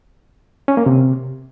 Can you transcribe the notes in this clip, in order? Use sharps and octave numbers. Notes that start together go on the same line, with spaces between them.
C#4
A#3
C3